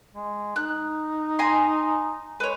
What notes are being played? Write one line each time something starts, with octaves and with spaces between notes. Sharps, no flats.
G#3
D#4 F#6
G#5 A#5 C6
G#3 B4 C#5